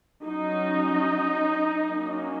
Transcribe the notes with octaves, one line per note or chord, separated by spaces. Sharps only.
F#3 C#4 D#4
F#3 A#3 C#4